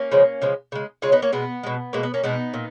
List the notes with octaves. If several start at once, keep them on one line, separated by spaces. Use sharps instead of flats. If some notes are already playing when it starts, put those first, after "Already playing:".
Already playing: A#3 C#4
C#3 F3 G#3
C#3 F3 G#3
C#3 G#3
C#3 G#3 C#4 F4
B3 D#4
A#3 C#4
B2 G#3 B3
B2 G#3
B2 G#3 A#3
B3
A#3 C#4
B2 G#3 B3 D#4
A#2